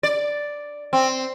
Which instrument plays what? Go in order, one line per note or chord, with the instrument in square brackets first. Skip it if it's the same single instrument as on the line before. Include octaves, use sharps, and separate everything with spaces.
[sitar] D5
C4